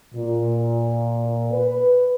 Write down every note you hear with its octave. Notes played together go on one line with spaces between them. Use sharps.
A#2
B4